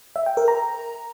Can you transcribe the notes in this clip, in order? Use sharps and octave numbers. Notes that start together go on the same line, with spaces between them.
E5
G5
A#4
A#5